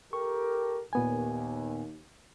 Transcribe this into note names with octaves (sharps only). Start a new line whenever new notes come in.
G4 A4 A#4 C#6
D#2 A#2 B3 G#5